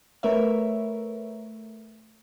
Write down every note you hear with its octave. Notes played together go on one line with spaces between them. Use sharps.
A3 A#4 B4 C#5 E5